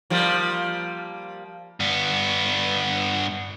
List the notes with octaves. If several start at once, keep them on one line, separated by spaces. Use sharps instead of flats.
F3 G3 A#3
G2 B3